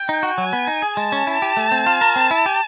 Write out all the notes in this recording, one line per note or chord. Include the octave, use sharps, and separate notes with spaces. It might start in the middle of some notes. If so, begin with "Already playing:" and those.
Already playing: G5
D#4
F#4
F#3 G#5
B3
D#4
G#4
G#3 A5
C#4
E4
G4
A3
C4
F4
A#4
C4
E4
G4